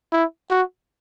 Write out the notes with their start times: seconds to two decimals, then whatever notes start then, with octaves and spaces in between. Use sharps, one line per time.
0.13 E4
0.51 F#4